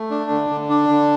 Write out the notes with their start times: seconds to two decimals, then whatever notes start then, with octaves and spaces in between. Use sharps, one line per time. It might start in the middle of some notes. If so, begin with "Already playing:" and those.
Already playing: A3
0.11 D4
0.30 D3
0.50 D3
0.69 D4
0.89 D3